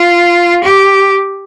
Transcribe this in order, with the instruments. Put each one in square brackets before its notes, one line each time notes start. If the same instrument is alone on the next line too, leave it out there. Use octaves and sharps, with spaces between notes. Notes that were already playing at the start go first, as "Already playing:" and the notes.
Already playing: [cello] F4
G4